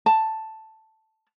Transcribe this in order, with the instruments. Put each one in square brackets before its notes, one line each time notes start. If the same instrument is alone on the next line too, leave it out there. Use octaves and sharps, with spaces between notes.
[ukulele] A5